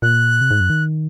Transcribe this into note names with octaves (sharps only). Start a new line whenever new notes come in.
A#2 F#6
C3
G#2
F#2
D#3